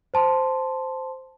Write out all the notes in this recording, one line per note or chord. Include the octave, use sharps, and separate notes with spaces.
C5 A5 C6